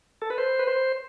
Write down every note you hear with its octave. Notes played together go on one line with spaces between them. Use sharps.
A4
B4
C5
B4
C5